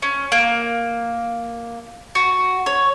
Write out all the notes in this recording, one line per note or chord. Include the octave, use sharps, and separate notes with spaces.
C#4
A#3
F#4
C#5